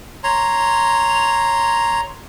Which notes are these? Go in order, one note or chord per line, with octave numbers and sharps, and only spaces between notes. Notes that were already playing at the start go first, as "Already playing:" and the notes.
C#5 A#5 C6